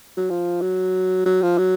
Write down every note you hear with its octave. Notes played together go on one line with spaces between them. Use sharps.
F#3
F3
F#3
F#3
F3
F#3